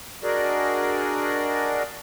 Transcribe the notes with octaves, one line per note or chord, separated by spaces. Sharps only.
D4 F#4 G#4 A#4 D5 D#5